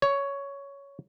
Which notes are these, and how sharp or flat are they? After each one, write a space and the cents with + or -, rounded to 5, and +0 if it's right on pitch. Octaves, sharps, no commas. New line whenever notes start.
C#5 +10